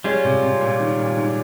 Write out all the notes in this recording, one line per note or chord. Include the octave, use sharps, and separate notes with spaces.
G3 G#3 C#4 F4
C3
C3
A#2
D#3
A#2
G#2